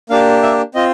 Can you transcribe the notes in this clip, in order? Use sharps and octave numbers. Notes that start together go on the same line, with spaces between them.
A#3 D4 G4 F5
E5
C4 F4 D#5